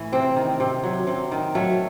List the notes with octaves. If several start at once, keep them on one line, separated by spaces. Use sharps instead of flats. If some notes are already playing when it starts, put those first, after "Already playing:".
Already playing: A2 E3
C3 C4
D#3
C3
F#3
C3
D#3
F#3 A3